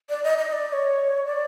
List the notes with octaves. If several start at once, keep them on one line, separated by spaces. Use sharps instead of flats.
D5
D#5
D#5
D5
D5
C#5
D5